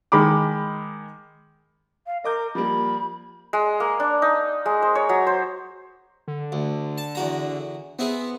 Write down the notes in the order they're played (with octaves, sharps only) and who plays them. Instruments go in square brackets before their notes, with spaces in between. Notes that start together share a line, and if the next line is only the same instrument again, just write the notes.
[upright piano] D#3 G#3 B5 D6
[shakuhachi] F5
[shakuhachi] A#4 [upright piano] D#5 D6 G6
[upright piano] F3 G3 A#3 [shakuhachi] B5
[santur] G#3
A#3
D4
D#4
G#3
C5
C#5
F#3
C5
[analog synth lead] D3
[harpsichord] D2
A5
E2 F#4 A#5
[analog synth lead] B3 [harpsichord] C4 E4 G#4